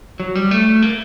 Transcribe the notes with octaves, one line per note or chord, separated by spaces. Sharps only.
F#3
G3
A3
A#3